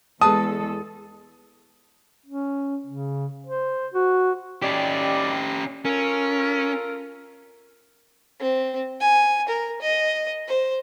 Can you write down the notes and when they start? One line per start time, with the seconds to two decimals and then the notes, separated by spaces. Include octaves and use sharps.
0.21 E2 G#3 G#4 A4 B4 A5 D#6
2.26 C#4
2.86 C#3
3.47 C5
3.94 F#4
4.62 G3 C#4 D#4 G4 D5
5.85 C#4 F4 A4 A#4
8.40 C4
9.00 G#5
9.48 A#4
9.82 D#5
10.48 C5